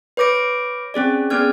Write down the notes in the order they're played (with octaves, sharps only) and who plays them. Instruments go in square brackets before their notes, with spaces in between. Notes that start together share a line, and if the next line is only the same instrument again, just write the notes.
[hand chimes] B4 C#5 D6 A#6 D7
C4 C#4 G#4 D5
B3 C#4 G#4 D5 F6 G#6